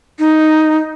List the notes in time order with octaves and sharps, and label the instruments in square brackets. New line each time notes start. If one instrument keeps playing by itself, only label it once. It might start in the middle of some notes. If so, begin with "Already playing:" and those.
[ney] D#4